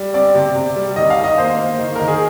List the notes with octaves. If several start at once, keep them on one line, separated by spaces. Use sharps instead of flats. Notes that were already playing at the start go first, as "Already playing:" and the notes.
Already playing: G3
C4 D5
C3
C3
G3
D#3 D#5
F5
D#3
D#5
A#3 C5
A#3
D#3
D#3 A#4
G#4